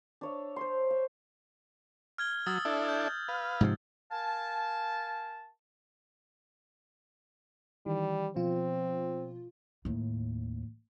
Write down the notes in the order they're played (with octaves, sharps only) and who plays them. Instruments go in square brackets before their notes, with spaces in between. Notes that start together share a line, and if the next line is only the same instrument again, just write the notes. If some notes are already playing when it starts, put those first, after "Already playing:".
[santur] D4 C#5 E5
C5 C#5 C6
E5
[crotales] F6 G#6 G7
[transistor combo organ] F#3 [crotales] D#6 E6 A6
[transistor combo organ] D4 E4 A4
[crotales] G6
[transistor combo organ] B4 F5
[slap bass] G#2 C3 F3
[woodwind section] A#4 F5 G#5 A5
[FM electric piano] D#3 E3 [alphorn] G3
[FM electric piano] B2 F3 F4 [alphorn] C4
[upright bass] D#2 A2